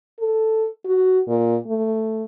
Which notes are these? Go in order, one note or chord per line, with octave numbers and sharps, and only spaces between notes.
A4
F#4
A#2
A3